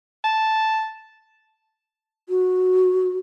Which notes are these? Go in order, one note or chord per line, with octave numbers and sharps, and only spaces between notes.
A5
F#4